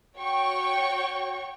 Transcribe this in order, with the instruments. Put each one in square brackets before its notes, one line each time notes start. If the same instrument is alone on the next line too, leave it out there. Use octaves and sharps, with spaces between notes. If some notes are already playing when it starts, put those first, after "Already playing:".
[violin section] F#4 C#5 G5 C#6